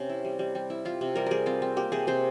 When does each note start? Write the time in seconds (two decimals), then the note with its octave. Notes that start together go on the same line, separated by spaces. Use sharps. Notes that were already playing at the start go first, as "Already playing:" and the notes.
Already playing: C3 C#4
0.10 E4
0.25 G3
0.39 G3
0.55 G3
0.70 E4
0.85 E4 F4
1.01 C3
1.16 G3 A#4
1.26 G3 G#4 A#4
1.46 C4 F4
1.62 C4
1.77 A#3 G4
1.92 C3 G#4
2.07 C3 C5